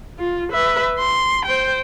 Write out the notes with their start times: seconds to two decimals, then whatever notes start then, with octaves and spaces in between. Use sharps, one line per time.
0.19 F4
0.52 B4 E5
0.99 C6
1.45 C5 G5